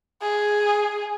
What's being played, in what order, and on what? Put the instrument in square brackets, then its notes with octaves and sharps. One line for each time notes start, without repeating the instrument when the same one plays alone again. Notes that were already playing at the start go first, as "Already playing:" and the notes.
[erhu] G#4